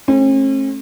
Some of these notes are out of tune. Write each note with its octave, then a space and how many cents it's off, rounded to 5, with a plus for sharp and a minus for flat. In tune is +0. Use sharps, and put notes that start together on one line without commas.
A3 -15 C#4 -45